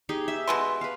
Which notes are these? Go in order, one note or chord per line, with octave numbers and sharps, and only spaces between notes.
D#4 G4 G#4
E5
B2 G#3 C6
B4 F5